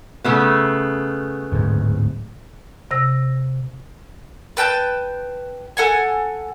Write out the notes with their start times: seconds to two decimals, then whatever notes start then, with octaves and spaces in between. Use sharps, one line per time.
0.24 C#3 A3 B3
1.52 D1 G#2
2.91 C3 E6 A#6
4.57 B4 G5 A5 G6
5.77 A4 F#5 G#5